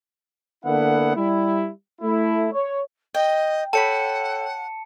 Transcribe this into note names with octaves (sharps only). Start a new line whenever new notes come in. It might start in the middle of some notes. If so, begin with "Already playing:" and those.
D3 A#3 B3 E4 F#5
G3 E4
A3 E4
C#5
D#5 G5
A4 C#5 F#5 G5 A5 B5 C#7